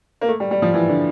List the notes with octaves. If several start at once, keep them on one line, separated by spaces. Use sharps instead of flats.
A#3
A3
G3
G3
F3
E3
D3